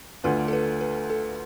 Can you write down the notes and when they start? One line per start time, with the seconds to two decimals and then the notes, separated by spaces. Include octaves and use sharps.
0.24 D2 D3 A3 D4 F4 B4
0.48 A4
0.53 B4
0.81 B4
1.10 A4